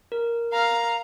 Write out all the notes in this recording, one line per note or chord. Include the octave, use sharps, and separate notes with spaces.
A#4
F5 A#5